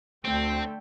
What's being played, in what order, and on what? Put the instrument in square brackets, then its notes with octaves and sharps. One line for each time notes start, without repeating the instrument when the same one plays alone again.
[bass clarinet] D2 [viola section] D3 G5 [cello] A3 [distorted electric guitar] C4